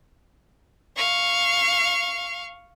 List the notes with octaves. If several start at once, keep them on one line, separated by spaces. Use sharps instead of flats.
F5 C#6